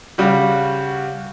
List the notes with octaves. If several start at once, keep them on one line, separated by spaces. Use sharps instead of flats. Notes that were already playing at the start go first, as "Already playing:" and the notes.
C#3 G3 F#4